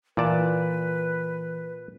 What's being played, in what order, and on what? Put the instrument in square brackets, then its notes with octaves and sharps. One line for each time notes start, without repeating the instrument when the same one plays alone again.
[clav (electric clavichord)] A#2 D5 A5 [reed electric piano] E3 [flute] B4